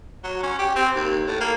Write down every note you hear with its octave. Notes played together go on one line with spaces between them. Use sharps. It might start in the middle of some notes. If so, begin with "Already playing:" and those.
F#3
C#4
G4
C4
D#2
A2
A#3